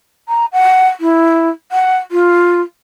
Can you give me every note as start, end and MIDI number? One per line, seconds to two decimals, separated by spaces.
0.28 0.46 82
0.53 0.88 78
1.00 1.49 64
1.72 1.97 78
2.11 2.61 65